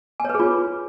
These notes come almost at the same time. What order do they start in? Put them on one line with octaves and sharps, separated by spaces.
G#5 C#5 B4 G#4 F4